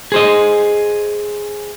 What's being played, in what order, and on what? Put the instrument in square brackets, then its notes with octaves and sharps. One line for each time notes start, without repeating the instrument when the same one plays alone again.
[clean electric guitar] G#4 C5 D#5